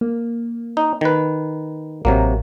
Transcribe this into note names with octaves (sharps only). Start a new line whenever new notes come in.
A#3
D#4
D#3 B4
A1 C3 F#3 A#3